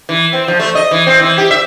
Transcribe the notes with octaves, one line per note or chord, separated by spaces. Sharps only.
E3
C4
F3
A3
D#5
E3
C4
E3
G4
E5